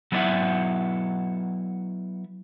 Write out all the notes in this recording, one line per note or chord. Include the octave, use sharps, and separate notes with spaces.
F#3 B3 E4 D5 E5 F#5